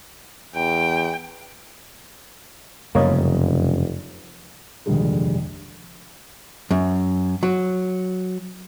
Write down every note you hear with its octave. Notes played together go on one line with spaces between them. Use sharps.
E2 G5
F1 F#2 C#3 G3 A#3 C#5 D#5
F1 A#1 D#2 D3 G3 G#3
F#2
F#3